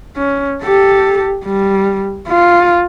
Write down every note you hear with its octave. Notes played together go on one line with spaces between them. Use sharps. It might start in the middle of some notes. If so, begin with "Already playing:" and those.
C#4
G4 A4
G3
F4